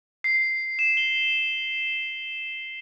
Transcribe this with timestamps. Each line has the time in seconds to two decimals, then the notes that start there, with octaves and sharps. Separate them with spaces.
0.24 C7
0.79 E7
0.97 G7